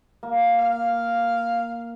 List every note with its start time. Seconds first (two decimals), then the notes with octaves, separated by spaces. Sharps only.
0.23 A#3
0.59 F5